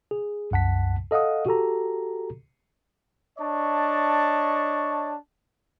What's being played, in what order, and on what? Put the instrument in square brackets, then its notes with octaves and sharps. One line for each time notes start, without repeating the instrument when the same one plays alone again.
[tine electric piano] G#4
C2 F#2 F#5 A5 B6
A4 D#5 F5 F#5 D#6
F#4 G4 A4 A#5
[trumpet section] D4 C#5 D#5 A5 C#6